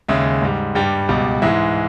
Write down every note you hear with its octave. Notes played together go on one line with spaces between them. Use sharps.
D#2 C#3 G#3 E5
G#2 G3
G2 G3 G5
C#2 B2 G3
G#2 E3 G#3 E5